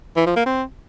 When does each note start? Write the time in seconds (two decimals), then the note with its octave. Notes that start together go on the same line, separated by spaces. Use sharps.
0.16 E3
0.26 F3
0.36 A#3
0.46 C4